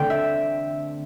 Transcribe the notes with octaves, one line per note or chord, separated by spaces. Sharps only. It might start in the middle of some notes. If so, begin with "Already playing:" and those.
Already playing: D3 A3 C4 G5
E5